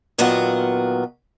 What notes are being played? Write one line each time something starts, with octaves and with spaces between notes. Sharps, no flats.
A#2 D#3 F#3 B3 F4 F#4